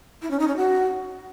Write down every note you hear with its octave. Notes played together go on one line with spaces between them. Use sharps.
E4
C#4
D#4
C#4
F#4